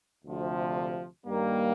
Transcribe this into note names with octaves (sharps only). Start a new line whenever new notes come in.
D2 C3 F3
G2 D#3 G3 A#3